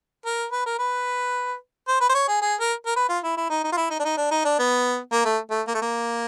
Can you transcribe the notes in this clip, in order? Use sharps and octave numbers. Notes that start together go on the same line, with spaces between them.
A#4
B4
A#4
B4
C5
B4
C5
C#5
G#4
G#4
A#4
A#4
B4
F4
E4
E4
D#4
D#4
F4
E4
D#4
D4
D#4
D4
D#4
D4
B3
A#3
A3
A3
A#3
A3
A#3